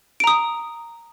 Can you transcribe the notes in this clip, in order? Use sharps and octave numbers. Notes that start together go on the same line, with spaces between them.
A#5 D#6 D7